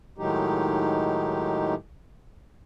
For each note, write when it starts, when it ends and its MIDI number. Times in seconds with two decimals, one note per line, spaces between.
0.18 1.75 45
0.18 1.75 51
0.18 1.75 54
0.18 1.75 56
0.18 1.75 63
0.18 1.75 67